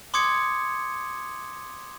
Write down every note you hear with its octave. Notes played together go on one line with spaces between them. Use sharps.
C6 D6 D#6 G#6 C#7